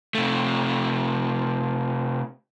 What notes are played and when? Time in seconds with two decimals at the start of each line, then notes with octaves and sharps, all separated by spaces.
0.15 C3 A3